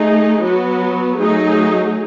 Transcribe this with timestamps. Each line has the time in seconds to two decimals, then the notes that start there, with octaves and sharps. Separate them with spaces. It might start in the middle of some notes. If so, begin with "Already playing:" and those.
Already playing: A3 D#4 G#4
0.41 F#3 B3 F#4
1.19 F#3 A3 D#4 G#4